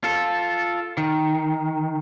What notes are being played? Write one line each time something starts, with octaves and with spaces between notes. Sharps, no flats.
F4 A4
D#3